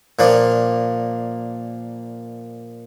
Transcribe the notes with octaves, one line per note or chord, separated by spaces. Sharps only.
A#2 F3 A#3 D4